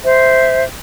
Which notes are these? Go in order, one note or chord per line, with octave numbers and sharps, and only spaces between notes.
C5 E5